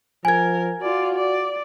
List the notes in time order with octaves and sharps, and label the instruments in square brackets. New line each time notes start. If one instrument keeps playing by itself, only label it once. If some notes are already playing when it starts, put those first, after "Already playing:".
[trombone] F3 [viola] A#4 [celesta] G#5 G#6
[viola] F4 D5 [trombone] F#4
[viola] D5